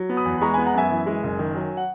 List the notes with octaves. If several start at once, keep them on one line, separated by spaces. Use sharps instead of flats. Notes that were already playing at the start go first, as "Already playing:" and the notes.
Already playing: F#3
B3
B5 D#6
E2
B5
G#3 A#5 C#6
B3 G#5 B5
F#5 A#5
F#2 E5 G#5
E3
G#3
F#1
D#3
F#3
F#5